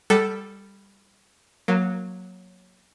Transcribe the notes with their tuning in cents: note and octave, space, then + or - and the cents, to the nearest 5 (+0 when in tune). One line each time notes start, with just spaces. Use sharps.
G3 +10 A4 +0 F#5 +30
F#3 -10 A#3 +0